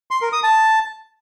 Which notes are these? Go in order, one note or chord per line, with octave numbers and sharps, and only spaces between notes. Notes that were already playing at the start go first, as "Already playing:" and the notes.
C6
A#4
D#6
A5